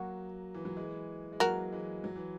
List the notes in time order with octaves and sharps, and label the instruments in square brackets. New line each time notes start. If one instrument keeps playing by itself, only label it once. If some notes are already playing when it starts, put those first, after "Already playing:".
Already playing: [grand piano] F#3 A#3 [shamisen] F#4
[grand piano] E3
F#3
E3 G#3
G#3
[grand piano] F#3 A#3 [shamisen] F#4 A#4
[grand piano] E3 G#3
F#3
E3